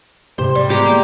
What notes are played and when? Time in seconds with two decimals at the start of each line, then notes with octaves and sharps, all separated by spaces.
0.38 G#2 C3 G4 C5
0.55 G3
0.69 G#3 B3 G4 A#5 C6 G6
0.86 A#3